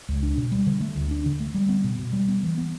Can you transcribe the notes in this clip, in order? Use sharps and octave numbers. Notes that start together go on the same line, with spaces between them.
C#2
D4
B2
G3
D3
A3
D2
D4
D3
A3
G3
B3
B2
B2
G3
B3
E3
B3